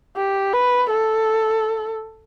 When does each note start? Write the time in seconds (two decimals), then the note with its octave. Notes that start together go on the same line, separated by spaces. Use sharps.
0.17 G4
0.53 B4
0.90 A4